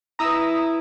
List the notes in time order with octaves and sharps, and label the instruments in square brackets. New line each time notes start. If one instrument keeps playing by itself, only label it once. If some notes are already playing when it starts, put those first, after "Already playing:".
[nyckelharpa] E4 B4 [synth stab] A#5 D#6 E6